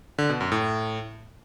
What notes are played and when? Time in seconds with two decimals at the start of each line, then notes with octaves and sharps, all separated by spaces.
0.18 D3
0.29 B2
0.41 F#2
0.52 A2